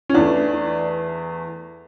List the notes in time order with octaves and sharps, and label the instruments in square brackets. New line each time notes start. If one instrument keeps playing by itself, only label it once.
[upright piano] C#4
E2 E3 A3 D4